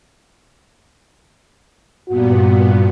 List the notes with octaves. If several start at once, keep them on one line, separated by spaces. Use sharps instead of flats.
G2 A#2 B3 F#4